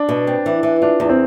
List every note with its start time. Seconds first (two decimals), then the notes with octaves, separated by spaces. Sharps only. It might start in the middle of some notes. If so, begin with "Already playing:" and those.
Already playing: D4
0.09 B2
0.27 C4
0.46 E3
0.63 E3
0.82 D4 F4
1.00 E2
1.09 C4